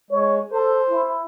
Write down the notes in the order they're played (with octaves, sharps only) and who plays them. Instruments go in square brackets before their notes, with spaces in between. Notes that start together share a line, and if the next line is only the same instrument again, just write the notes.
[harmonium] G#3 [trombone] C#5
[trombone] A4 [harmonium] C5
[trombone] E4